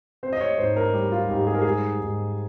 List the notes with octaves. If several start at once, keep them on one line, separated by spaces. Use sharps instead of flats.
C4 C5
D#5
C#5
G#2 C5
A#4
G3 G4
F4
G#2 G4
G#4
A#4
G#3 G#4
G#2